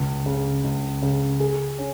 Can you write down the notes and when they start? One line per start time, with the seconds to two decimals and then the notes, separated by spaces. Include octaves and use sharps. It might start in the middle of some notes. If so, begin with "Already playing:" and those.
Already playing: C#2
0.26 C#3
0.64 C#2
1.02 C#3
1.40 G#4
1.79 C#4